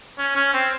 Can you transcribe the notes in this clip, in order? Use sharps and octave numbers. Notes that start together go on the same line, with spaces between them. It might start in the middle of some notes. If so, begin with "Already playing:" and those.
C#4
C#4
C4